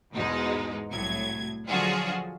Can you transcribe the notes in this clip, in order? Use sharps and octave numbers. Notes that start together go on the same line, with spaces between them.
E2 G#2 B2 G#3 D#4
C2 A2 F#3 G#6
D3 F3 F#3 F4 F#4 G#4